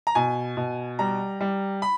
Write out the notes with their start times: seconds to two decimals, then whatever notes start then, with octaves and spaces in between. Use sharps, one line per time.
0.07 A#5
0.15 B2 G#5
0.57 B2
0.99 G3 A#5
1.41 G3
1.82 B5